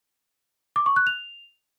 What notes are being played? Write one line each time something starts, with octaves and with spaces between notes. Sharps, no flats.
D6
C#6
F#6
F7